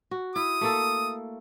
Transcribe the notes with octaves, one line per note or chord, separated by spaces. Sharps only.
F#4
E4 D#6
A3 A#3 A4